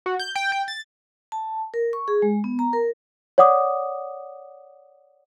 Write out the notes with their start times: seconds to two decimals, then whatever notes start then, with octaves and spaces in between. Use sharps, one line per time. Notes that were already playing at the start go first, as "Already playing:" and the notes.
0.06 F#4
0.19 G6
0.35 G5
0.52 G5
0.68 A6
1.32 A5
1.74 A#4
1.93 C#6
2.08 G#4
2.22 G#3
2.44 B3
2.59 A#5
2.73 A#4
3.38 C#5 D5 F#5 D6 D#6